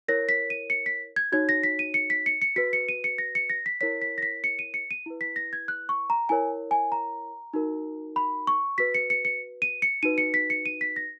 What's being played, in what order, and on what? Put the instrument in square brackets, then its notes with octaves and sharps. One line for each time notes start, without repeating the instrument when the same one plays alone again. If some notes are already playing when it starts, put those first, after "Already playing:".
[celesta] E4 A#4 C#5 A#6
B6
D#7
C#7
B6
G#6
D#4 F#4 C#5 G#6
A#6
B6
D#7
C#7
B6
C#7
C#7
F#4 B4 B6
C#7
D#7
C#7
A#6
C#7
A#6
B6
E4 A#4 C#5 B6
B6
A#6
B6
C#7
D#7
C#7
D#7
E4 B4
B6
A#6
G#6
F#6
C#6
A#5
E4 A#4 C#5 G#5
G#5
A#5
D#4 F#4 A#4
B5
C#6
F#4 B4 B6
C#7
C#7
C#7
D#7
C#7
D#4 F#4 B4 D#7
C#7
B6
C#7
D#7
B6
A#6